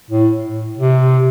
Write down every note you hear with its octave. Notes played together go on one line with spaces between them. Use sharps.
A2
C3